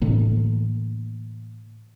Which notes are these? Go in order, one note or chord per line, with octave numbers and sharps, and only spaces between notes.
A2 D3 E3 A#3